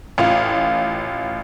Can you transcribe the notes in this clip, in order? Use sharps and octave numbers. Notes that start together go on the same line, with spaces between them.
A1 F4